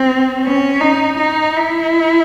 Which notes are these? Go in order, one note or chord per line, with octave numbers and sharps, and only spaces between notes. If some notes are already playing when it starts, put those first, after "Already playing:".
Already playing: C4
C#4
D#4
D#4
E4